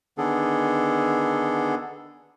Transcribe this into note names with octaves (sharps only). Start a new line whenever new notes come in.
D3 D#3 B3 D4 G#4 A4